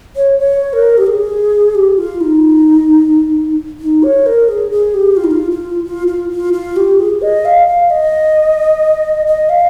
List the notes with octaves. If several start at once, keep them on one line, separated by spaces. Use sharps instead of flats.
C#5
C#5
A#4
G4
G#4
G4
F4
D#4
D#4
C#5
A#4
G#4
G#4
G4
F4
D#4
F4
F4
F4
F4
F4
F4
G4
G#4
D#5
F5
F5
D#5
D#5
F5